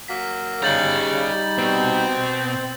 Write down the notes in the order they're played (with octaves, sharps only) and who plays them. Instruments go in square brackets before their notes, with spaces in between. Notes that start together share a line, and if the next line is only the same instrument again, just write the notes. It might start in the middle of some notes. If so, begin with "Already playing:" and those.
[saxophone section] F#3 A#3 [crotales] B6
[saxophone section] C#3 [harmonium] G3 D#4 [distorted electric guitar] G4 A#5 [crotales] G6 A6 F#7
[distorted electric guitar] B2 [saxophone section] C4